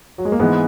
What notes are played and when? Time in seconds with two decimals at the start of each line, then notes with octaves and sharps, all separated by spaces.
0.18 F#3
0.25 G#3
0.32 A#3
0.40 G#2 E3 G#3 B3